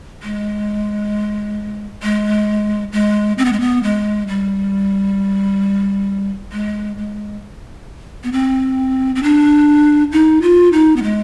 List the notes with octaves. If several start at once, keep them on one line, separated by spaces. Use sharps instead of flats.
G#3
G#3
G#3
C4
B3
G#3
B3
G#3
G3
G#3
G#3
B3
C4
C4
D4
D#4
F4
D#4
B3
G#3